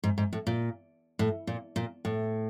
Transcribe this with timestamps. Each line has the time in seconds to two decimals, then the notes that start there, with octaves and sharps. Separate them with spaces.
0.04 G#2
0.18 G#2
0.33 A2
0.47 A#2
1.19 A2
1.47 A#2
1.76 A#2
2.05 A2